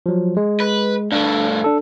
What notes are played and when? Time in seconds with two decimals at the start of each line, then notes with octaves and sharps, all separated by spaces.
0.06 F3 F#3
0.37 G#3
0.60 B4
1.12 G2 A3 D4
1.64 D4 A4